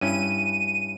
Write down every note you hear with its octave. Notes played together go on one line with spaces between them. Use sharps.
G2 C#4 E4 D#7